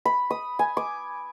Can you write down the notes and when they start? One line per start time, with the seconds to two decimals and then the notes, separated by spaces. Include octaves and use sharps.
0.05 B5
0.30 D#6
0.59 G#5
0.77 D6